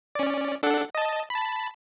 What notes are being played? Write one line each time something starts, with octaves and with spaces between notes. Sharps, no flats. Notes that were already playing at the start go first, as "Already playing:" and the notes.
C#4 D5
D4 A4 F#5
D#5 A5
A5 B5